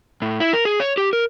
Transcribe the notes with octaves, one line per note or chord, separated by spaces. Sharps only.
A2
E4
A#4
G#4
C#5
G4
A#4